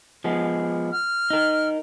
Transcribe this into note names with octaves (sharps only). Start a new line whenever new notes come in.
F3 G#3 B3
F6
D#4 A#4